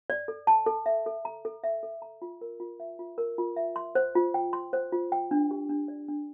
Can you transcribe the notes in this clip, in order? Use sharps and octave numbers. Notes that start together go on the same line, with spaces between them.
D5
A4
A5
A4
E5
A4
A#5
A4
E5
A4
A#5
F4
A#4
F4
E5
F4
A#4
F4
E5
C6
C5
F4
G5
C6
C5
F4
G5
D4
G4
D4
D5
D4